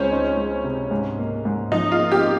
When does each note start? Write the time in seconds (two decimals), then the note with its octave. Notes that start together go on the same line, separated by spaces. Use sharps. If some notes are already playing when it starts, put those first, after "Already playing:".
Already playing: C#2 C#4 C5 C#5
0.11 D#4
0.37 G#3
0.64 C3
0.91 G#2
1.19 A#3
1.45 G#2
1.72 F3 D#4
1.92 F4
1.98 A#3
2.12 G4